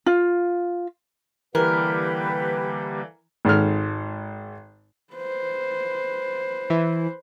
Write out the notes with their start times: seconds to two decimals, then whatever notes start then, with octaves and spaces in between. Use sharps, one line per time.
0.06 F4
1.55 D3 E3 G3 A#3 G4 A#4 B4
3.45 G#1 G#2 A4 F6
5.14 B4 C5
6.70 E3 E4